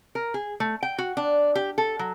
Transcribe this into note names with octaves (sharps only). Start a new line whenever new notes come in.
A#4
G#4
A3
G5
F#4
D4
G4
A4
F#3